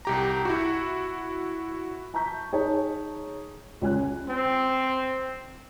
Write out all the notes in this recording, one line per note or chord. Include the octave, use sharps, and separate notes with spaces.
C2 G4 A#5
E4 F#4
A5 A#5 C#6 G6 B6
D#4 G#4 C#5 A5
C#2 C#4 G#5 F#6
C4